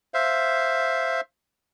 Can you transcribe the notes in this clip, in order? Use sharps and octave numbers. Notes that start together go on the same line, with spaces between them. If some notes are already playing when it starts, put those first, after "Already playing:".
C5 E5 F5